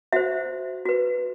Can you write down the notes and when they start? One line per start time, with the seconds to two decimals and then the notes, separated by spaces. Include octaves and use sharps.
0.13 F#4 C5 E5
0.86 F#4 B4